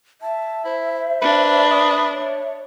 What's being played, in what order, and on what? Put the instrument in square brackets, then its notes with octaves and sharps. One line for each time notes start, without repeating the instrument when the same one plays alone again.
[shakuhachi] E5 [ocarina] A5
[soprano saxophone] E4 [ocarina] C5
[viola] D4 [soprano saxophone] B4
[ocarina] D#6
C#5